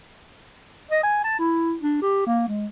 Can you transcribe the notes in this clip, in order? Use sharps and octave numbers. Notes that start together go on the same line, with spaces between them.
D#5
G#5
A5
E4
D4
G4
A#3
G#3